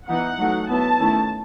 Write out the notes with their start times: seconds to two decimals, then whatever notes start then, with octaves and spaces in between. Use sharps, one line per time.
0.08 E3 B3 D#4 F#5
0.39 F#3 A3 D#4
0.69 F#3 B3 E4 A5
1.00 D#3 A3 C#4 E4